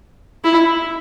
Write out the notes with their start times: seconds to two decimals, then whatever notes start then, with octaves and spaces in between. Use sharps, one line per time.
0.44 E4